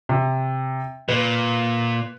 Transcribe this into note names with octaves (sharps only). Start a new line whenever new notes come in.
C3
A#2 B4